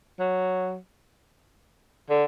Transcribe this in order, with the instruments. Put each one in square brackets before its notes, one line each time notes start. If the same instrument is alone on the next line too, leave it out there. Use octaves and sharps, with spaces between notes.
[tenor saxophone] F#3
D3